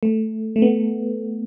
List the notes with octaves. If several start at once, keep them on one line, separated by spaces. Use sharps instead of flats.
A3
A3
B3